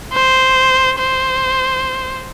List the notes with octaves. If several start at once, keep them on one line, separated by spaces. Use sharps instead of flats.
C5
C5